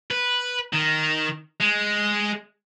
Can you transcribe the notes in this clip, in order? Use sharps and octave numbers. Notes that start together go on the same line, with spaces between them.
B4
D#3
G#3